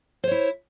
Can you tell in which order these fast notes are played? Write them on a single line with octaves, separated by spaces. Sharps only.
C5 C#5 E4